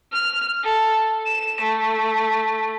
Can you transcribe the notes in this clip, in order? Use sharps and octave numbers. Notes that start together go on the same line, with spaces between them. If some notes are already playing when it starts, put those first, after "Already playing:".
F6
A4
E7
A3